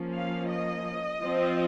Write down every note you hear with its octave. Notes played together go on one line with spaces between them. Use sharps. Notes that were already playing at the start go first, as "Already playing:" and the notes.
Already playing: F3 A#3 C#4
F5
D#5
F3 C4